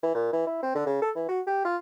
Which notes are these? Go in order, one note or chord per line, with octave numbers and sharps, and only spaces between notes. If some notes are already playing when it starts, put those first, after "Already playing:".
E3
A#2
E3
E4
C4
D3
C#3
A4
E3
F#4
G4
F4